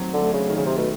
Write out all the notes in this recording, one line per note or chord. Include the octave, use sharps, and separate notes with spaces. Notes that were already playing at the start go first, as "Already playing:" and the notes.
Already playing: D#3 F#3 A3 C4
D3
A3
C#3
D#3
C#3
C3
B2 A3